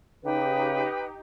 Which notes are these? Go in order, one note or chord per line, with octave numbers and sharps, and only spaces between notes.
C#3 D#4 G4 B4 G5